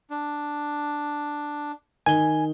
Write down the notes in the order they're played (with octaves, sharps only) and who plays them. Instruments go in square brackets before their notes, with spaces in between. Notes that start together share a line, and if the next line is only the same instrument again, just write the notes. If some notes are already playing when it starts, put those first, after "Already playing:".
[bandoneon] D4
[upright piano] D#3 G7 [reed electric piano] G#5